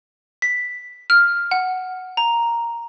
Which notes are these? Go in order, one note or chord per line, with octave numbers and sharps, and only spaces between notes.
B6
F6
F#5
A#5